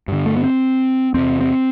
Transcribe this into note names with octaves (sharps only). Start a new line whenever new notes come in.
G2 D3
A3
B3
C4
E2 C3 C4
C4